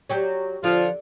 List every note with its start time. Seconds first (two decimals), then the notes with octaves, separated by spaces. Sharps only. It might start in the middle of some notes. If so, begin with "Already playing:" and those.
0.10 F#3 G4 C#5
0.64 D3 F3 F4